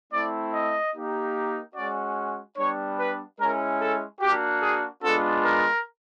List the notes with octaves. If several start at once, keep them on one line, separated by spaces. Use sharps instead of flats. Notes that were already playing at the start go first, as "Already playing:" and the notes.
A3 C4 E4 D5
D#5
A#3 D#4 G4
G#3 C#4 F#4 D5
G3 B3 D4 C#5
B4
G#3 C#4 E4 A#4
A4
A#3 D4 F#4 G4
G#4
G#3 B3 D4 F4 A4
A#4